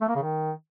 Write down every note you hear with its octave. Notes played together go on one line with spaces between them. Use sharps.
A3
A#3
C#3
D#3